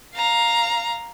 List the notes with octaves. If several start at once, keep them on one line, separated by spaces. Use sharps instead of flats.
F5 A#5